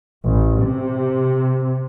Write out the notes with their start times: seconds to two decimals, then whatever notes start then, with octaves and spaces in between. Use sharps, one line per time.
0.25 A1
0.61 C3